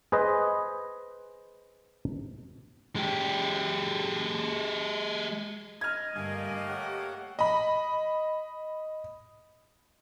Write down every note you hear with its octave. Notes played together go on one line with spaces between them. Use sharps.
G#4 B4 C5 D#5
G#3 G4
D#5 F6 G#6
G2 D3 G3 A3 A#3 G#5
G4 C#5 F#5
D#5 B5